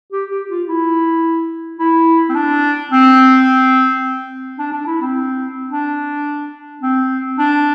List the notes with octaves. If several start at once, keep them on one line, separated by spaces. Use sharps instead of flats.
G4
G4
F4
E4
E4
C4
D4
C4
D4
D4
E4
C4
D4
C4
D4